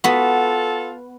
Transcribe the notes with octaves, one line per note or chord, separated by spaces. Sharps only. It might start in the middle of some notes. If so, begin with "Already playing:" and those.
B3 F4 F#4 A4